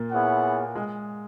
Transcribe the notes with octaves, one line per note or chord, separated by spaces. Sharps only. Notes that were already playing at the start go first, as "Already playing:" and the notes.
Already playing: A#2 A#3
B3 E4 G#4 C#5 F#5
G#3